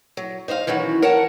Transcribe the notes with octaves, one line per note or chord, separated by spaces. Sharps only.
F#3
D#4 C5 D#5 F5
D#3 E3 F#3 C#4 F#4
A#4 C#5 F5 F#5 A5